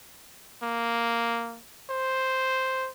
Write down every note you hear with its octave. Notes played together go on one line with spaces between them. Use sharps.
A#3
C5